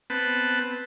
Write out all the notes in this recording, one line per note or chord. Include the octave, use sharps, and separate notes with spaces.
B3 C4 B4 A5